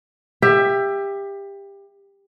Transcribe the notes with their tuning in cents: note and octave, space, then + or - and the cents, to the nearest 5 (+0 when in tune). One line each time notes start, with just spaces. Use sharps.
G4 +20 E5 +15